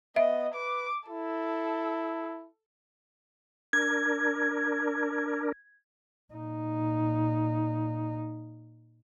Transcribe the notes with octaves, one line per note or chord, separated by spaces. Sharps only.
B3 D#5 E5
B4 D6
E4 A4
D4 A#4 G#6
A#2 D#4